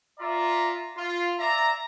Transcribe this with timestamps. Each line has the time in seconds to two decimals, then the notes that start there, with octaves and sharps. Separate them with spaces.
0.19 F4 D5 E5 A#5
0.96 F4
1.39 D5 E5 A#5